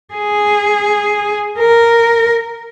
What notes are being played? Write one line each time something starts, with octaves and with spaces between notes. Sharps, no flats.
G#4
A#4